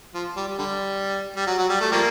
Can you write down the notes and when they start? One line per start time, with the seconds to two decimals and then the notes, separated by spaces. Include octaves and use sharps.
0.14 F3
0.37 G3
0.48 G3
0.59 D3 G3
1.36 G3
1.47 F#3
1.59 F#3
1.70 G3
1.81 A3
1.92 F3 G3 A#3